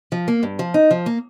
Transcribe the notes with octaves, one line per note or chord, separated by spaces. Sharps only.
F3
A#3
G2
F3
D#4
F3
A#3